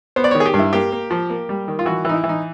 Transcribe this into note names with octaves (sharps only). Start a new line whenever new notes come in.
B3 C5
D5
D#3 C#5
G#4
G4
G2
E4
A#3 G4
A#3
F3
A#3
G3
D#3
F4
E3 F#4
E3 D#4
E4
E3
D#4